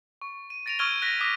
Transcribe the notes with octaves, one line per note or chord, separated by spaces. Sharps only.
C#6
D#7
A6 A#6 D7 D#7 F7
C#6 E6 F6 G#6 D#7 G7
F#6 A#6 B6 D#7
D6 D#6 F#6 A#6 B6